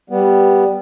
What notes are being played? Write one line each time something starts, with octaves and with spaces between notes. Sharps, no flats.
G3 B3